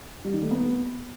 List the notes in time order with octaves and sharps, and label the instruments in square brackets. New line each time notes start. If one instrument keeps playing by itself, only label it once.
[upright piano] G3
D#3
A3
B3